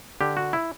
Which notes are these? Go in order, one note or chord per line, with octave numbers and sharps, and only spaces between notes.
D3 G4
F#4
E4